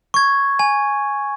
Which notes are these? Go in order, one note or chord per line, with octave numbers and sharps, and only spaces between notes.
C#6 G#6
G#5